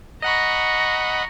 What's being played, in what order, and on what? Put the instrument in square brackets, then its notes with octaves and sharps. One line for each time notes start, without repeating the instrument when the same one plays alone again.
[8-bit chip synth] D#5 F#5 B5 [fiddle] A#5 C#6 [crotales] A#6